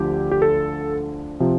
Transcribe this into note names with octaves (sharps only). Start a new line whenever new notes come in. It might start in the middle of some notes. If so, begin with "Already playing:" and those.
Already playing: D2 D3 F3 G4
G4
A4
C3 F3